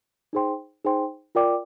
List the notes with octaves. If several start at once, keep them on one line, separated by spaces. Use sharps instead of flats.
D#4 G#4 C5 G5 C6
D#4 G#4 C5 G5 C6
F4 A#4 D5 G5 D6